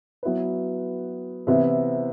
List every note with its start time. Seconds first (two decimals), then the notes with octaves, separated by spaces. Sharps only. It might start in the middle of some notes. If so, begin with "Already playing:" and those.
0.23 F#3 B3 E4 B4
1.47 C3 E3 B3 E4